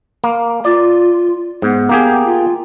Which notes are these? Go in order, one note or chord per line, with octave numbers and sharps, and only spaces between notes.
A#3
F4 D5
G#2 B3
A#3 G4 G#4
F4